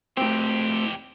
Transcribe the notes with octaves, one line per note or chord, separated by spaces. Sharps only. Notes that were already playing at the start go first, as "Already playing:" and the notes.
F2 A2 C4 G4